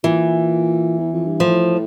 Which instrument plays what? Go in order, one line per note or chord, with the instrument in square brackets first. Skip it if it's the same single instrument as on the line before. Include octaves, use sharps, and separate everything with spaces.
[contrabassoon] A#2 [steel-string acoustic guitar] E3
[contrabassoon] E2
F2
G2
[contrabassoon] A2 [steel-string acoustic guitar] F3